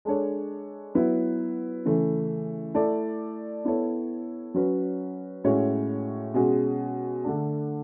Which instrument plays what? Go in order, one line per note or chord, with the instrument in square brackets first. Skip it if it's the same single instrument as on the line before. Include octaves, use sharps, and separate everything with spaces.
[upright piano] G#3 D4 A4 C#5
F#3 B3 E4 B4
C#3 E3 A3 E4
A3 E4 A4 D5
B3 E4 A4 C#5
F#3 C#4 F#4 B4
A2 G#3 C#4 F#4 C#5
B2 G#3 C#4 G#4
D3 A3 D4